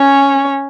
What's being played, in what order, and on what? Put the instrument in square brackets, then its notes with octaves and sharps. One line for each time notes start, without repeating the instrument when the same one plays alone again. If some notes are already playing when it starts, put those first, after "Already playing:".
Already playing: [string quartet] C#4 C#5